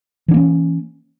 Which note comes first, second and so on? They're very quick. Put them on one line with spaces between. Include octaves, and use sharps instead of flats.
E3 D4 A#3 C#4